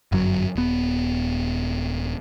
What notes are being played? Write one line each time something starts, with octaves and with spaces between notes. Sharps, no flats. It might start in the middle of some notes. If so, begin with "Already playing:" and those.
G1 F#2 F#3
D#1 B3